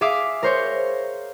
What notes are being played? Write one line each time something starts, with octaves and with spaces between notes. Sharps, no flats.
G#4 E5 F5 D6
A#4 C5 C#5